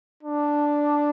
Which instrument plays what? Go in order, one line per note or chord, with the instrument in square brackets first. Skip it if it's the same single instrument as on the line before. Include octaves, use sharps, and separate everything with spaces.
[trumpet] D4